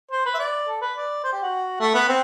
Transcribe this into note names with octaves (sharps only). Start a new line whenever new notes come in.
C5
B4
E5
D5
A4
B4
D5
C5
G4
F#4
A3
B3
C4